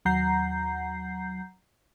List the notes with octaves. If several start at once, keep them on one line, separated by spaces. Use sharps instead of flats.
D#2 F#3 F#5 A#5 G6 C7